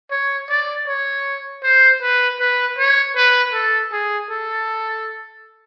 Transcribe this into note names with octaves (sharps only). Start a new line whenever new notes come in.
C#5
D5
C#5
C5
B4
B4
C#5
B4
A4
G#4
A4